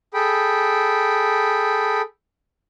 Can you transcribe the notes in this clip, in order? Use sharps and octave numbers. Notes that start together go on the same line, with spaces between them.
G#4 A4 G5 B5